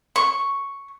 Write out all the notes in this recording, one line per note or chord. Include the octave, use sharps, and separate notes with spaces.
C#6